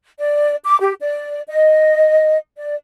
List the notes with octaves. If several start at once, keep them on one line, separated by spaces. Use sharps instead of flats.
D5
D6
G4
D5
D#5
D5